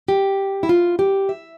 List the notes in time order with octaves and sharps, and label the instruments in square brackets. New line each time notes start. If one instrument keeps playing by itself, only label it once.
[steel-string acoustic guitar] G4
E4
F4
G4
E5